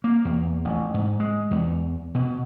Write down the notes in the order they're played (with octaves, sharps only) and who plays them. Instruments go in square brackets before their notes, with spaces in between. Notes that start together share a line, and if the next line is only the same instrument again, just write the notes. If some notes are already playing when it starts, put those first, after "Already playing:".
[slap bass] A#3
E2
A1
G#2
G#3
E2
B2